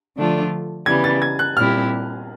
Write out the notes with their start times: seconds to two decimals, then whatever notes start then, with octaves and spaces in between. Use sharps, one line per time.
0.17 D3 F3 A3 D4 F4
0.86 C#3 E3 G3 B3 G#6
1.04 A6
1.22 G#6
1.39 F#6
1.57 A#2 G3 C4 E4 G4 F6